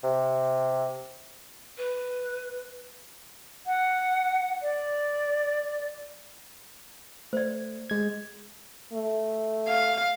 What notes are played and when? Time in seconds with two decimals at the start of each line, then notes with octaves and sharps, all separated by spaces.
0.04 C3
1.77 B4
3.67 F#5
4.62 D5
7.33 A3 C5 D5
7.90 G#3 G#6
8.93 A3
9.68 F5